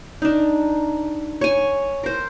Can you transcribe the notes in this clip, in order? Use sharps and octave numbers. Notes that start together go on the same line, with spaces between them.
D4 D#4
C#5 G#5
A#4 C5